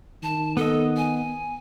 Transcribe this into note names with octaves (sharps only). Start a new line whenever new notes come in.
D#3 A5
B3 A4 D#5
G#5